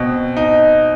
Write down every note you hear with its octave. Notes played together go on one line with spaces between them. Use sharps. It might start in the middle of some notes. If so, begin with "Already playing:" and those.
Already playing: B2 C4
D#4